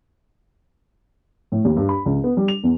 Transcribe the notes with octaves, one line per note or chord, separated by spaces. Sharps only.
A2
D#2
G2
B5
C#2
B3
G3
F7
E2